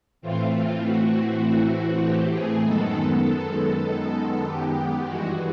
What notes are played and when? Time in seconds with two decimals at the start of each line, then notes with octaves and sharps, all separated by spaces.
0.21 A2 E3 A3 C4 F4
0.52 F4
0.83 F#4
2.03 G4
2.34 G#4
2.64 F#2 D#3 G#3 B3 A4
3.85 A4
4.46 G4
5.07 G2 E3 G#3 F#4